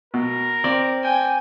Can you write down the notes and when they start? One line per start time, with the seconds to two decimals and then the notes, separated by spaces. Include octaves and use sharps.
0.14 B2 A#4
0.64 C4 D5
1.03 G5 G#5